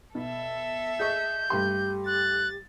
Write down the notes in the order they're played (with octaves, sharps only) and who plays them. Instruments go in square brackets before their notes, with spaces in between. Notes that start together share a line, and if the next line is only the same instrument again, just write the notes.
[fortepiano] B2 [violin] A4 E5
[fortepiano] G#4 D#5 C#6 [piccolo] G6
[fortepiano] G2 A3 C6 [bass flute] G4
[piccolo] F#6 [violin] A6